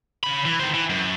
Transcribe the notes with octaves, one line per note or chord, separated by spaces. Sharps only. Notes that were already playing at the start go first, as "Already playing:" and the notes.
C#3 B5
E3
D#3 C5
E3
F#2